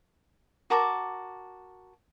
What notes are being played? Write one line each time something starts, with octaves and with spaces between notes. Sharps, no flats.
F#4 A#4 A5 D6